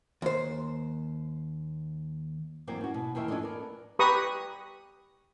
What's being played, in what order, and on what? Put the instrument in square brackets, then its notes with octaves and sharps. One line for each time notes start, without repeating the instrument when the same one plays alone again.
[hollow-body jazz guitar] D#2 C5
[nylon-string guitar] E2 F#3 A#3 C4 D5
C#4 F#4
B2
E2 D#3 A#3 C#5 E5 G5
F3 C#4 D4 A4 D#5
B3 A#4 D5
[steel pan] G4 B4 A#5 B5 C#6 D#6